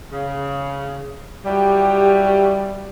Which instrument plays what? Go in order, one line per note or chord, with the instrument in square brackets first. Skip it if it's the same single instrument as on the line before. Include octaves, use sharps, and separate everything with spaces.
[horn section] C#3
[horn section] F#3 E4 G4 [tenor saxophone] G3